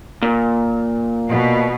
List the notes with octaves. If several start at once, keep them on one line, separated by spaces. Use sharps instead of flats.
A#2
B2